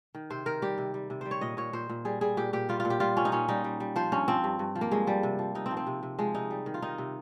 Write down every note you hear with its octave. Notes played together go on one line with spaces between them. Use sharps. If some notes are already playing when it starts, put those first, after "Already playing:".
D#3
C3 C5
D#3 A#4
G3 G4
C3
G3
C3
G3 C5
C#5
A#2 D#5
A#2 C#5
A#2 C5
A#2
G3 G#4
G3 G#4
A#2 G4
A#2 G4
G3 F4
F4
A#2
G4
G3 F4
A#2 C#4
D#4
A#2 C#4
G3 D#4
G3
G3
F3 C5
G2 C#4
F3 C4
G2
G2
F3
A#3
G2 G#3
F3 G3
C3
F3
C3 D#4
C4
F3
C4
C3
C3
F3 G#3
C3 D#4
G3
D#3
F4
D#3 D#4
C3